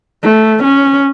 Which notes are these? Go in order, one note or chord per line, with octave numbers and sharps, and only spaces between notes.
A3
C#4